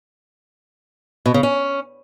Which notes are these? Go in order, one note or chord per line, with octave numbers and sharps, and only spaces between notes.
B2
C#3
C#4